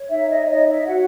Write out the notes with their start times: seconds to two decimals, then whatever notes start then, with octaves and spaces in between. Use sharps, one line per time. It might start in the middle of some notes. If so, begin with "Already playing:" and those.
Already playing: C#5
0.10 D#4 E5
0.30 D#5
0.48 C#5 D#5
0.67 E5
0.87 F#4 F#5